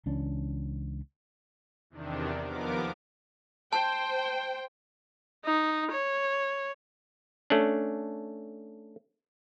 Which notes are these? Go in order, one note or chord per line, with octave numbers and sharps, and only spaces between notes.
C#2 E3 C#4 D4
E2 C3 D#3 D4
D#2 F3 B3 A#4 D6
C5 G5 A5
D#4
C#5
A3 C#4 D4